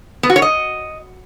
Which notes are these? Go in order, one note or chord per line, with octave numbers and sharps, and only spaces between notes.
B3
F#4
C#5
D#5